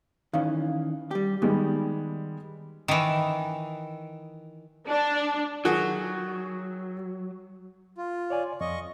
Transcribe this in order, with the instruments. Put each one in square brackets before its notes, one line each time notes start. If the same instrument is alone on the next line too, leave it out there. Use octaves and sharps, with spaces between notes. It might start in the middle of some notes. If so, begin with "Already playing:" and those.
[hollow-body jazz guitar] D#3 E3 C#4 [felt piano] F5
[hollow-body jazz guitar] G3 G4
[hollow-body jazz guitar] D#3 [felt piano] G3 G#3 B3
[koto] D#3 E3
[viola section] D4
[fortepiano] D#3 F#4 G#4 [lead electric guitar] F#3
[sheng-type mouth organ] F4
[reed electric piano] C#5 D5 G#5
[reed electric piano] F2 [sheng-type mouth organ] D#5 C#6